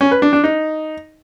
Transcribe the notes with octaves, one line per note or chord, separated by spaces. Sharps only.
C#4
B4
D4
D4
D#4